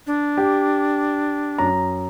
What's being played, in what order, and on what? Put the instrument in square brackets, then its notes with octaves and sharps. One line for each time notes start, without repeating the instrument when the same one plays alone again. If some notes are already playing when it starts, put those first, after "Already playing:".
[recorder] D4
[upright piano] G4
F#2 A#5